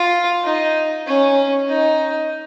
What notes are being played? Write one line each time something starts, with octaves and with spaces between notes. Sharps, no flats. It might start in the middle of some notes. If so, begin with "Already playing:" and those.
Already playing: F4
D#4
C#4
D#4